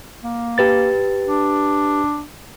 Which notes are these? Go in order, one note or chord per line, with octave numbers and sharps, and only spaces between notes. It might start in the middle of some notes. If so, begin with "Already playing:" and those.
A#3
G4 B4 A6
D4